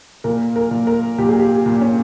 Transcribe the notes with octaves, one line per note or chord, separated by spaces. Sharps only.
A#2 A#4
A#4
A#2
A#4
A#2 G4
G#4
G4
A#2
C#4